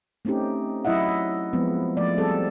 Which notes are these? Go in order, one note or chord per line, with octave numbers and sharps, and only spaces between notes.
A3 C4 C#4 D#4 G4
F#3 E4 D#5 E5 F#5
F3 G#3 B3 C4
F3 A3 D5
G3 C4 G#4 A4